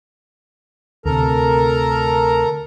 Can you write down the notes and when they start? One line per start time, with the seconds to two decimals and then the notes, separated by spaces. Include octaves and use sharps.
1.05 D2 C3 A4 A#4 A#5